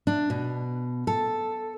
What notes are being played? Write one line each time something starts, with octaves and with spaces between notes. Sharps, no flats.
D4
B2
A4